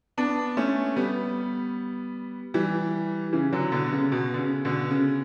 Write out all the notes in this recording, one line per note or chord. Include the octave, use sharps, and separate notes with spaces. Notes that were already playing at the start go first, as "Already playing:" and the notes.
B3 D4
A3 C#4
G3 B3
E3 G3
C#3 E3
D3 F#3
B2 D3
C#3
B2
D3
C#3
B2 D3
C#3